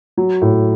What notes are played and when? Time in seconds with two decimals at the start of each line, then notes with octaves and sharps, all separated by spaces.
0.17 F#3
0.42 A2